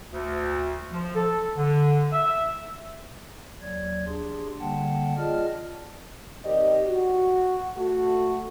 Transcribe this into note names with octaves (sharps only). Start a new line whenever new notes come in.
D2
F3
A4
D3
E5
D#2 F#3 D5 G#6
D4 G4 G#4 C6
D3 G3 A#3 F#5 G5 A5
F4 G#4 D5 D#5 A5 F6
D#3 C4 G4 A#4 D5 D#5
F#4
A3 F#4